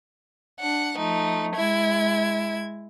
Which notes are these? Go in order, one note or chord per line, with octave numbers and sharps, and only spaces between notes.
D4 F#5
F3 A3 D#4
G#3 E4 G#6